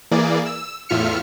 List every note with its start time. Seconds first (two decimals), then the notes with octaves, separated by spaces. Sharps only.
0.11 E3 A#3 G#4 D5
0.46 E6
0.89 E2 A2 F4 E5 F6 C#7